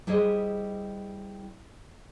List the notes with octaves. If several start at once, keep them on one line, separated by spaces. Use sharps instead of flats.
G3 E4 G#4 C5 D#5